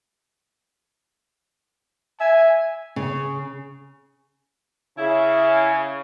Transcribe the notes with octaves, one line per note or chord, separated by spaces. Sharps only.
E5 G#5
C#3
C#3 E4